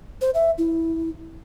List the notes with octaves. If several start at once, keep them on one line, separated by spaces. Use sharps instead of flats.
C5
E5
E4